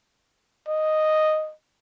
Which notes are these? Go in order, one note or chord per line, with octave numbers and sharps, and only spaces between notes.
D#5